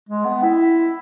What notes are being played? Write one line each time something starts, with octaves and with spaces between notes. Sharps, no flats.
G#3
B3
E4